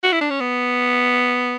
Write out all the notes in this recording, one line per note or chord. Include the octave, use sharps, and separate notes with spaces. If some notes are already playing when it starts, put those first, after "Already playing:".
F#4
E4
D4
C#4
B3